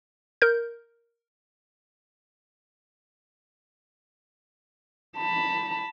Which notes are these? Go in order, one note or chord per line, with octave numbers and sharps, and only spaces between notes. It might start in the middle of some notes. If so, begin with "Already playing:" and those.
A#4 G6
A5 B5